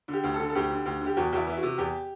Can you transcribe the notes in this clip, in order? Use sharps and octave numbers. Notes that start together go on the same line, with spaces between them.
D3
G4
D2
A4
D3
A4
D2 G4
D3
D2
D3
G4
E2 F#4
E2 E4 F#4
E3
E4
F#4
C3
E2 G4